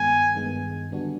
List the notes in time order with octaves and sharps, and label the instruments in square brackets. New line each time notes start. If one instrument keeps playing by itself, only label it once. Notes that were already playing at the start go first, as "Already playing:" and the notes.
Already playing: [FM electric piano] G2 D#3 G#3 B3 [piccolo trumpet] G#5
[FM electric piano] G2 D#3 G#3 B3
D3 G3 B3 D4 F#4